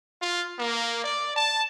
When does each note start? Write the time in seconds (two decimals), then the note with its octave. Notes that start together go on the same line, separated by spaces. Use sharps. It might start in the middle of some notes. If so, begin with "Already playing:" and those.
0.22 F4
0.59 A#3
1.04 D5
1.36 A5